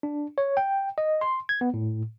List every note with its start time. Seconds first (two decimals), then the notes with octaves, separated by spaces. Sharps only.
0.03 D4
0.38 C#5
0.57 G5
0.98 D#5
1.21 C6
1.49 G#6
1.61 B3
1.74 A2